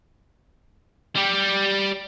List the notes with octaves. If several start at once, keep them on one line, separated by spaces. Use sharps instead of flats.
G3 G4